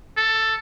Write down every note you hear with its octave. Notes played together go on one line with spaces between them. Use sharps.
A4